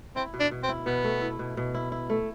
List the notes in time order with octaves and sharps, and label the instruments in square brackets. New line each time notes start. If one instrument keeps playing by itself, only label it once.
[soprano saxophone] C4 [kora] E4
[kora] B2
[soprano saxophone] D4
[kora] B2
[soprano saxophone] C4
[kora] E4
[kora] B2 [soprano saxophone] B3
[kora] A3
E4
B2
B2
E4
E4
A3